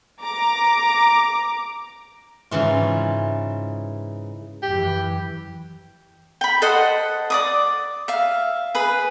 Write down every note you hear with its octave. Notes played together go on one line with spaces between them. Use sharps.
A#5 D6
G#2 C#3 E3 F4
F#2 E3 G4
G5 B5
A4 C5 D#5 F#5
D5 D6 D#6
E5 F5
G#4 B4